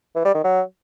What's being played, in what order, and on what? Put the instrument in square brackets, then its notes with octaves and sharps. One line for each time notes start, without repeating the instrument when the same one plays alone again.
[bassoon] E3
G3
D#3
F#3